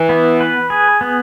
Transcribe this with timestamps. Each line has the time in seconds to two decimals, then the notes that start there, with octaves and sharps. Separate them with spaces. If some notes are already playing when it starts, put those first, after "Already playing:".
Already playing: E3
0.09 B3
0.41 B4
0.70 G#4
1.01 B3